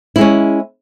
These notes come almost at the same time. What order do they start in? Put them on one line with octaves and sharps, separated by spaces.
E4 G#3 C#4